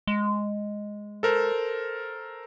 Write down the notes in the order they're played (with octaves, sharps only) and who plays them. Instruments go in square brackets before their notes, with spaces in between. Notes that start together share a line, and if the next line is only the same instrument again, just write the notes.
[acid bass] G#3
[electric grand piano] A4 A#4 C5